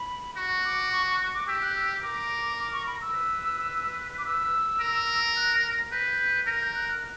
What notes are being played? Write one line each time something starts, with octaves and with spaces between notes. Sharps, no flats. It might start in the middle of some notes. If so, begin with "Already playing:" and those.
Already playing: B5
F#4 C#6
D6
C#6
C#6
C#6
D6
G4 E6
F#6
E6
A#4 D6
D6
C#6
B5
E6
B4
D6
E6
A#4
F#6
A#6
A#6
B4 G6
A#4 A#6
G6
F#6
F#6